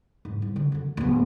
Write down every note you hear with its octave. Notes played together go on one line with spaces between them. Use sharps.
G#2
C2
D3
F#2 D3
D1 B3